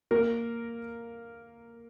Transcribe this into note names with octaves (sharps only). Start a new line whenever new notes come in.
A#3 A#4